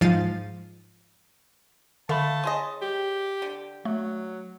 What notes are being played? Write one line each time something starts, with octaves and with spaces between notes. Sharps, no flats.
G#2 F3 F5 A6 D#7
D3 A3 F5 A5 B5
C#4 G#4 D#5 C6
G4
D3
F#3 A3